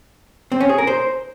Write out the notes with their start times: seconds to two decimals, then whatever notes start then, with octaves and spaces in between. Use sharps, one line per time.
0.52 C4
0.60 C#4
0.69 G#4
0.78 A#4
0.87 C5